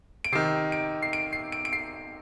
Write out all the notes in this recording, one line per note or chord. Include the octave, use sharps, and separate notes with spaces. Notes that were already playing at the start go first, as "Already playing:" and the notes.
D7
C3 D#3 C7
D7
C7
D7
C7
D7
D7
C7